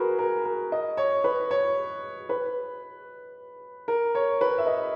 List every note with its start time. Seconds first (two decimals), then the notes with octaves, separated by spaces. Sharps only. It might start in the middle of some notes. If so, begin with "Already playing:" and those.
Already playing: F#4 G#4 A#4 B4
0.19 A#4
0.45 A#4
0.72 D#5
0.97 C#5
1.24 B4
1.51 C#5
2.29 B4
3.88 A#4
4.15 C#5
4.41 B4
4.58 E5
4.67 D#5